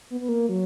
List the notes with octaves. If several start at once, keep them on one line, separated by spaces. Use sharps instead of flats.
B3
B3
A#3
F#3